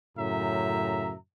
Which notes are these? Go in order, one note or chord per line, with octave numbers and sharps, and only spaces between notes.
F#2 A2 C#3 E5 A#5